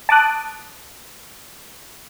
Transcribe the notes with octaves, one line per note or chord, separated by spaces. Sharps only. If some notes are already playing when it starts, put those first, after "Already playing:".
A5 D6 D#6 F#6